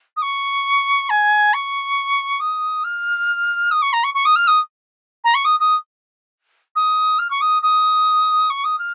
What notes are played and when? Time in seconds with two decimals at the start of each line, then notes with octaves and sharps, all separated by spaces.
0.16 D#6
0.22 C#6
1.10 G#5
1.53 C#6
2.40 D#6
2.84 F6
3.71 D#6
3.82 C#6
3.93 A#5
4.04 C#6
4.14 C#6
4.25 D#6
4.36 F6
4.47 D#6
5.24 A#5
5.34 C#6
5.45 D#6
5.60 D#6
6.75 D#6
7.19 F6
7.30 C#6
7.41 D#6
7.62 D#6
8.50 C#6
8.64 D#6
8.79 F6